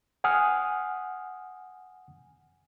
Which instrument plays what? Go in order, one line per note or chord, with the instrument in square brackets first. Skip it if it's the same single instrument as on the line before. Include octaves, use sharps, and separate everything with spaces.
[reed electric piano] F#5 G#5 D#6 F6